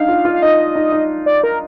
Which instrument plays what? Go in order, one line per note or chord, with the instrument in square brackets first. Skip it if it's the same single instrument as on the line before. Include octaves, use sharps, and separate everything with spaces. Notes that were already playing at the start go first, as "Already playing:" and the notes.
Already playing: [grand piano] D4 D#4 [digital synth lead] F5
[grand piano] F4
F4
[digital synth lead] F5
[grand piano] D#4 [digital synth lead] D#5
[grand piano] D#4
D#4
[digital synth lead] D5
A#4